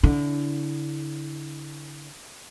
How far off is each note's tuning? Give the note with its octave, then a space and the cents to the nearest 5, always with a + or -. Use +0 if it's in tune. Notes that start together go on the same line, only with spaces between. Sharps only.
D3 -30 E4 -30